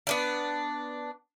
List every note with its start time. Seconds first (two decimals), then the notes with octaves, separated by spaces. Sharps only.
0.07 B3 D4 D5